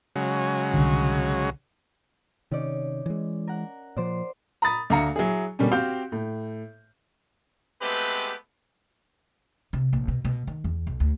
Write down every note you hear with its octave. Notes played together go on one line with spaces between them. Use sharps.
C#3 F#3 G#3
C2 D3
C3 D#3 C#4 D#4 D5
E3 G#3
A#4 F#5
A#2 F3 C5 D5
A#5 B5 D#6 A6
D2 D4 F5 A#5 C#7
F#3 E4 G#4
B2 D3 G3 A#3 C#4
C4 F#4 G4 F5 G5 G6
A2
G#3 A3 B3 C4 G4 B4
C3
A#1
B2
B2
D#3
E2
B1
D2